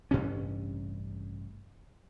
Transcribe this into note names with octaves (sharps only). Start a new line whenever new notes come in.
A1 G2 C3 C#4